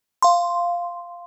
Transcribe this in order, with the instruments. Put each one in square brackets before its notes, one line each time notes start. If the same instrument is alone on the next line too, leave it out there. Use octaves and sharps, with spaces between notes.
[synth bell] F5 C6